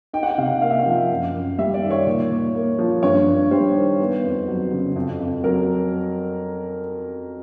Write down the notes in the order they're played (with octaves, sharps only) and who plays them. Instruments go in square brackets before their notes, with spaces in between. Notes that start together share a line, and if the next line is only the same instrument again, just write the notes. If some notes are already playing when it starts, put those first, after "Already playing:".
[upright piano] D#4 G5
F#5
G5
C3 F5
F#5
A#3 F5
E5
F5
F3
F#2
F#2
G3 E5
D5
D#3
C#5
A#2
A#2
A#3
F3
G2 C#5
G2
G3 C5
D#3
B3
F2
F#3
C#3
F2
F2
F#3 A#4